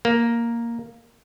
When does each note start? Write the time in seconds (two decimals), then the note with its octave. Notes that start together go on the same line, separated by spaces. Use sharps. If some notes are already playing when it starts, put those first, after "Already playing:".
0.05 A#3